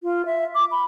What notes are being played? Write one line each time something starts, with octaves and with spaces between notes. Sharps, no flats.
F4
E5
D6
B5